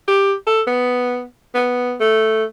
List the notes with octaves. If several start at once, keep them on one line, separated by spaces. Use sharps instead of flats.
G4
A4
B3
B3
A3